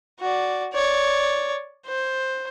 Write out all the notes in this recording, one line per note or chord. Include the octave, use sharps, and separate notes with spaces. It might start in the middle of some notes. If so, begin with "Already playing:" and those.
F#4 D5
C#5 D5
C5